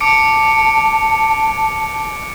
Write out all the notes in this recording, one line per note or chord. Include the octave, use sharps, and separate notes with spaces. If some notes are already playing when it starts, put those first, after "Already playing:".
A5 D6 C#7 D7